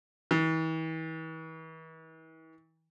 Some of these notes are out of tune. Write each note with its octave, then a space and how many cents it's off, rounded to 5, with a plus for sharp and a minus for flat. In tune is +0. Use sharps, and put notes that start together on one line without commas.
E3 -40